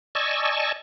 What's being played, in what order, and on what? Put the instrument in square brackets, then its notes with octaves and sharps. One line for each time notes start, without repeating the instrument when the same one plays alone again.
[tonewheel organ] D5 D#5 G#5 A5 C#6 E6